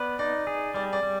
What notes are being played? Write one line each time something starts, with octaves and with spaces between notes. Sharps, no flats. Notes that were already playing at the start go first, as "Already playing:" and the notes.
Already playing: B3 B4 D5
D#4 D5
G#4
G3 D5
D5
G3